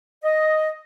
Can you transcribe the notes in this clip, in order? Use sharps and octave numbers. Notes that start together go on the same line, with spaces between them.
D#5